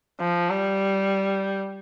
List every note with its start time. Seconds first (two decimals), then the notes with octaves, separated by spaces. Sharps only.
0.20 F3
0.50 G3